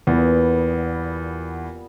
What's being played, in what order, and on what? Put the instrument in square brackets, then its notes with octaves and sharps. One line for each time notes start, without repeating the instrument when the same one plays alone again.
[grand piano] E2 [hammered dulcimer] A#2 G3 B3